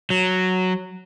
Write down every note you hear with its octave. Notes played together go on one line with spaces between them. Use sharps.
F#3